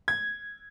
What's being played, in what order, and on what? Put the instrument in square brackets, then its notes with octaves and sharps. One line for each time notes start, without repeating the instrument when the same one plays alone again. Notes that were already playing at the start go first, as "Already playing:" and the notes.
[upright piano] G#6